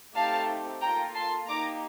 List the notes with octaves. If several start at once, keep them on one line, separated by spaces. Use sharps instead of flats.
A3 C4 D#4 G4 F5 A5
A#3 F4 A4 G5 A#5
A5 C6
A#3 D#4 G4 A#5 D6